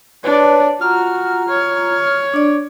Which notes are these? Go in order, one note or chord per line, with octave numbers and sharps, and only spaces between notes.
D4 B4 C#5 D5 A5
F4 F#4 A#5 F6
C#5
D4 D5